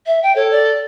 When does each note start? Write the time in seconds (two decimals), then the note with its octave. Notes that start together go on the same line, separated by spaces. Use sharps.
0.06 E5
0.23 G5
0.35 A4 C#5
0.51 D5